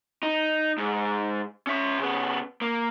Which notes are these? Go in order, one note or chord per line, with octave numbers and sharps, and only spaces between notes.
D#4
G#2
C#4 E5
C#3 B3
A#3